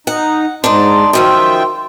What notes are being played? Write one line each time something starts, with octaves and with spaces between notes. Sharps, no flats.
D#4 F#5
G#2 D4 D#4 C6
F#2 D#3 F3 E5 G5